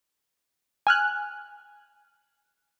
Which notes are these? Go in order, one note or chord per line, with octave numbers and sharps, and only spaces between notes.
G#5 F6 F#6